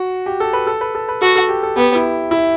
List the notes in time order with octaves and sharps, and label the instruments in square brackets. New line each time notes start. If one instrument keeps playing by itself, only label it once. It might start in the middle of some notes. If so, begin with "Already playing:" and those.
Already playing: [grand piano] F#4
G4
A4
B4
A4
B4
A4
B4
[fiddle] F#4 [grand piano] A4
[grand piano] A4
G4
A4
[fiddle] B3 [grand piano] G4
[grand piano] E4
E4